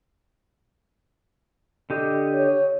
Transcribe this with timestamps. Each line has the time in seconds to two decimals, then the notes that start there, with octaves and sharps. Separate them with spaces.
1.90 D3 G4 D#5
2.34 C#5